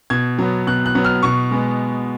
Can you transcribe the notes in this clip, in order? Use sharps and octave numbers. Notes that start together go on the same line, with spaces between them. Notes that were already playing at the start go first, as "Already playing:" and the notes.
B2 G#6
F#3 B3
B2 F#6
F#6
F#3 B3
F6
B2 C#6
G#3 B3